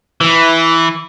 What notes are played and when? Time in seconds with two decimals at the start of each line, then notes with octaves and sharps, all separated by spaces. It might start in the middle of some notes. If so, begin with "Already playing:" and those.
0.21 E3